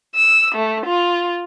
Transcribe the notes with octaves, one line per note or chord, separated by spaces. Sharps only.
E6
A3
F4